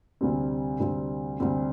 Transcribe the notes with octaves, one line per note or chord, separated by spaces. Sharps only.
D2 C3 G3 C4
D2 C3 G3 C4
D2 C3 G3 C4